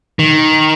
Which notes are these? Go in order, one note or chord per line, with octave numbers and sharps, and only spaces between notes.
D#3